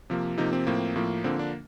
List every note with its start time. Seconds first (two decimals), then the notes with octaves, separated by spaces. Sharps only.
0.10 C3 F3 A#3
0.37 C3 F3 A#3 D#4
0.53 C4
0.67 A2 F3 A#3
0.96 A2 F3 A#3
1.24 D3 F3 A#3 C4
1.39 D4